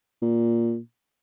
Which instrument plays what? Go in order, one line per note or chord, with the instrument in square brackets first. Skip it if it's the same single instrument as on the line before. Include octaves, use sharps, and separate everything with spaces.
[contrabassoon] A#2